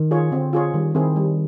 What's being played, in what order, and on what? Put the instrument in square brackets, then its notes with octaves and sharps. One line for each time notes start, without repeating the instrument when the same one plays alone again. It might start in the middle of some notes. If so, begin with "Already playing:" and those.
Already playing: [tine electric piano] D#3
[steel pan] F4 G#4 C#5
[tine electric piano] D3 [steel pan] C4
[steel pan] F4 G#4 C#5
[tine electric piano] D#3 [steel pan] G3
[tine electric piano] D#3 [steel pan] C4 E4 G#4
[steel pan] G3